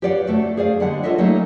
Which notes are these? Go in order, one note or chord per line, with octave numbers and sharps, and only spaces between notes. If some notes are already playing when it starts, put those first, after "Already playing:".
G4 B4 C#5 D5 F5 F#5
C3 A3 F#4
G#4 C5 D5 F5
D3 G3 G#3 A#3 F#5
F4 A4 C#5 D#5 E5
F#3 G3 A3 A#3 C#4 D#4